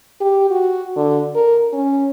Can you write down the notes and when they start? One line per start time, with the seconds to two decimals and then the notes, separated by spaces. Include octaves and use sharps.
0.21 G4
0.50 F#4
0.96 D3
1.35 A#4
1.73 C#4